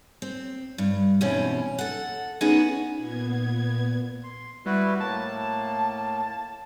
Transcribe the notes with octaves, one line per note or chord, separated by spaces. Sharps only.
C4
G2
E2 G#2 B2 C4 C#4
A4 F#5
B3 C#4 D#4 F#4 G#4 F#5
A#2 B3 G#6
C6
G3 E4 F#4 B4
A2 A#3 A5